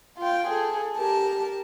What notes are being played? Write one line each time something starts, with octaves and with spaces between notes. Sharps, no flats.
F4 G5
G#4 A4
G4 A#4 A5